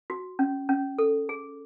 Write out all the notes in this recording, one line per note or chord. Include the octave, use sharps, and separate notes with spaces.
F#4
C#4
C#4
A4
G#4